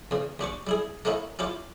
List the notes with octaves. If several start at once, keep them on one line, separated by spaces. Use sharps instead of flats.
E2 C#3
D#2 D4 G4 C#6
G3 E4 G#4
A3 A#3 C#4 D#4 E4
C#4 E4 F4 G4